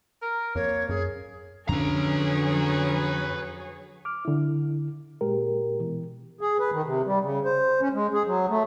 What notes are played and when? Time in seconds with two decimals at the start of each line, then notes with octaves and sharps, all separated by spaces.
0.22 A#4
0.55 F2 A#3 C#5
0.89 F#2 G#4
1.69 F2 D3 F#3 C#4 G#4 B4 C#5 A#5
4.05 D6 F6
4.25 D3 E4
5.21 A#2 G#3 G4 A#4
5.80 B2 E3
6.41 G#4
6.60 B4
6.72 D#3
6.84 C3
7.06 G3
7.22 C#3
7.45 C5
7.81 C#4
7.93 G#3
8.14 G#4
8.26 F#3
8.49 A3